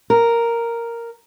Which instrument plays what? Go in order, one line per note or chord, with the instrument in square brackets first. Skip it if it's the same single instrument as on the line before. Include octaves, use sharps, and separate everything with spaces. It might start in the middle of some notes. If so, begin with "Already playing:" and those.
[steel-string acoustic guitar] A#4